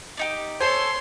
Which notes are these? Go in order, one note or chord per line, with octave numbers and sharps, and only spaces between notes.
D4 D#4 G4
A4 C5 C#5 G#5 C6